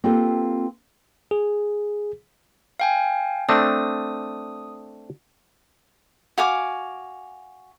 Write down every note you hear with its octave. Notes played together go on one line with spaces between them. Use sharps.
A#3 C4 F4 G4 A4 B4
G#4
F5 G5 G#5
A3 C4 D4 D#6
F#4 F5 G#5 D6